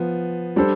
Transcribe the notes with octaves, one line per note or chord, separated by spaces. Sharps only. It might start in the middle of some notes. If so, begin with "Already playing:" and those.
Already playing: F3 B3
G3 D4 A4 C5